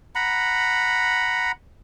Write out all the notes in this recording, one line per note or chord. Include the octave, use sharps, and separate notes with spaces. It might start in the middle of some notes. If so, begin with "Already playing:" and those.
F#5 A#5 B5